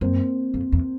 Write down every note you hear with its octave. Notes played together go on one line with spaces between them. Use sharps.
F#2 A#3 C4
F2
E2